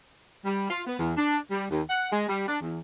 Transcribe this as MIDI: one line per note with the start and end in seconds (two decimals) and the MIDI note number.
0.45 0.68 55
0.70 0.81 65
0.86 0.98 59
0.99 1.12 40
1.17 1.37 62
1.50 1.65 55
1.70 1.82 39
1.88 2.07 78
2.12 2.28 56
2.29 2.44 55
2.47 2.57 62
2.61 2.80 40